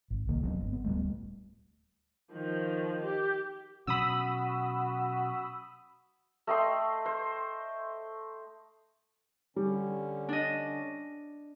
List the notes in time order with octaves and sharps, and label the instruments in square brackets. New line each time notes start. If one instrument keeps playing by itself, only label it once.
[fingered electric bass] G#1
D1 C2 D#3 A#3
E1 F#3 B3 C#4
G1
B3
D1 A#1 G3 A3
[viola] D#3 F3
G4
[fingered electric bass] B2 F#3 C#4 [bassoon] F#4 [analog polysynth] B5 D#6 E6
[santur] A3 D#5 G5 C6
C5
[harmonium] D3 C#4 [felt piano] G3
[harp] D4 D#5